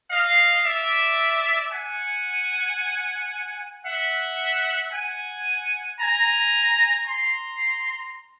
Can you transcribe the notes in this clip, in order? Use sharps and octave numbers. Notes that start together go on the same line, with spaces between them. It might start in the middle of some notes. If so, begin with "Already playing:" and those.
D#5 F5
D5 E5
F#5 G#5
E5 F#5
F#5 G#5
G#5 A#5
A#5 C6